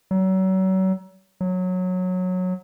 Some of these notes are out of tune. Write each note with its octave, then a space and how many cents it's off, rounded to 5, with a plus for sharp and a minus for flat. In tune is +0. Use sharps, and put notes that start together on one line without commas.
F#3 +35
F#3 -15